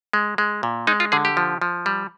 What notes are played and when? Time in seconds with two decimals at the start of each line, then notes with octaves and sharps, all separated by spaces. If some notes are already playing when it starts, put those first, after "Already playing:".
0.13 G#3
0.38 G#3
0.63 A#2
0.87 G#3 D#4
1.00 F4
1.12 D3 G#4
1.25 G4
1.37 F3
1.62 F3
1.86 G3